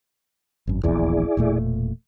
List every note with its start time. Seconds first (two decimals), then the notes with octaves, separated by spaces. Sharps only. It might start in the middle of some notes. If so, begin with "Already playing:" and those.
0.67 G#1 F#2
0.84 D#1 A#1 E2 E4 G#4 D5
1.37 E1 A#2 A3